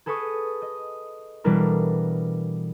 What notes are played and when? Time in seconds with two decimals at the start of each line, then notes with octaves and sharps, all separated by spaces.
0.06 G#4 A4 B4 C#6 D#6
0.62 D#5
1.44 B2 E3 G3 D4 A4 A#4